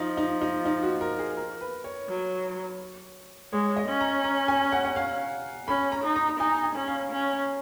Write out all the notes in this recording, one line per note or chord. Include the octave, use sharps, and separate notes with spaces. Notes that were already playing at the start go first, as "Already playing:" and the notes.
Already playing: F3 D#4
D#4
D#4
D#4
F#4
A#4
G#4
A#4
B4
C#5
F#3
G#3 C#5
D#5
C#4
A#5
A#5
G#5
F#5
F#5
F5
C#4 B5
A#5
D#4
A#5
D#4 G#5
G#5
C#4
F5
C#4